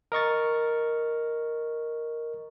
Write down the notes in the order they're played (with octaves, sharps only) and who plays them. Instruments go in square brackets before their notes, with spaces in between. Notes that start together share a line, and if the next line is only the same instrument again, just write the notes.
[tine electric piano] A#4 D#5 C#6 A6